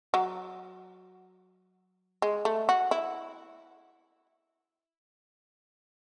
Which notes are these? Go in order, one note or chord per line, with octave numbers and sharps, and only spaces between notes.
F#3
G#3
A3
F#4
E4